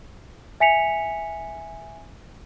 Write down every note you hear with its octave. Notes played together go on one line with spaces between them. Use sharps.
E5 G#5 B6 C#7 F7